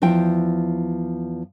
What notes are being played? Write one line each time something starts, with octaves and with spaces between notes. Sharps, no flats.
E2 F3 E4 G5